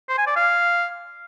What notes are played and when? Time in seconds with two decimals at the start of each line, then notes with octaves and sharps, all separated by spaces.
0.09 C5
0.18 G#5
0.27 D5
0.36 F5